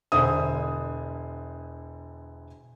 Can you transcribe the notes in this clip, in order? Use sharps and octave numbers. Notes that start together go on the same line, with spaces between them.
E1 D3 C5 E5 D#6